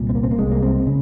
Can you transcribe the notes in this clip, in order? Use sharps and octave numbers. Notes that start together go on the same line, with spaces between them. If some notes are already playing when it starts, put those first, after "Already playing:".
Already playing: C2 A#2
C4
A#3
C4
A#3
C2 C3 G#3
A#3
C4
C#3